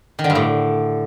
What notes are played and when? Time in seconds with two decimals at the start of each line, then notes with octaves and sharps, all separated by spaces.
0.19 D#3
0.24 D3
0.30 G2
0.35 A2